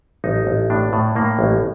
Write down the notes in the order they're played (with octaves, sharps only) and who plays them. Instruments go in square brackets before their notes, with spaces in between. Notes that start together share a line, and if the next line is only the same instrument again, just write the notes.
[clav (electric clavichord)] A1 D#4
A1
A2 D4
A2
A2 A#3
A1